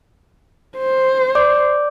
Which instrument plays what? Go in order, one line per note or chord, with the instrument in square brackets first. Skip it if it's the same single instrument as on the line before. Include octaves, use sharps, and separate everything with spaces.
[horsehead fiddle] C5
[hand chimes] D5 D6 G6